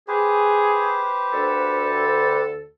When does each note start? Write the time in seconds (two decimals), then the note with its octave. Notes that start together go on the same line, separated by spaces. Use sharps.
0.08 G4 G#4 B4 C5
1.33 D2 A4